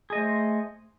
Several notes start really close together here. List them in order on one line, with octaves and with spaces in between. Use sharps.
G#4 D#5 A3 C5